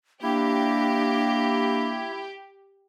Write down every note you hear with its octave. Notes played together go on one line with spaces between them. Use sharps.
A#3 D4 E4 G4